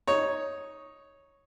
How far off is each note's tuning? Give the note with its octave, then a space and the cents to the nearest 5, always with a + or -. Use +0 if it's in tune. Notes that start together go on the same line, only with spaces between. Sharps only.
D#4 +5 C#5 +0